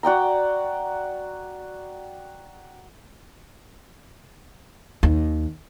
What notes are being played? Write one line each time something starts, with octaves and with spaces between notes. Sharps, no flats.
F#4 D5 G5 A#5
D#2